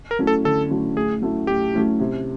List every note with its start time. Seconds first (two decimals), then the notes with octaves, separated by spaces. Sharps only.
0.11 A#4
0.19 F#3 A3 C#4 E4
0.27 A4
0.44 D3 A4
0.70 F#3 A3 C#4 E4
0.96 A2 G#4
1.22 F#3 A3 C#4 E4
1.47 A2 G4
1.73 F#3 A3 C#4 E4
2.00 C3